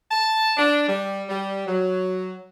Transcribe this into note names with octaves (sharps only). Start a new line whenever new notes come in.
A5
D4
G3
G3
F#3